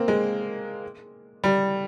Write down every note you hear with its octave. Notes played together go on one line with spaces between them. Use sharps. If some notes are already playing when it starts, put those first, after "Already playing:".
Already playing: A#3 C4
G#3
G3